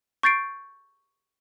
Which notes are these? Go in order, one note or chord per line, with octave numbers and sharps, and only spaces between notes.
C#6 G6 A6 C7 D7